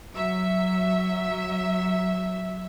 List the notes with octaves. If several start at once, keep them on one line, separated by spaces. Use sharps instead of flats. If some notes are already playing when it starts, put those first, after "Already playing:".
F#3 E5